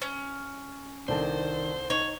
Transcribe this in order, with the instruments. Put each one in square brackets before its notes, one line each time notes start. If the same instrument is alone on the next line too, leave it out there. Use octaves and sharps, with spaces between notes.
[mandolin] C#4
[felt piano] C2 A4 A5 [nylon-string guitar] D#3 C4 D4 [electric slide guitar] C5
[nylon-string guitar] D#4 [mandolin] C#5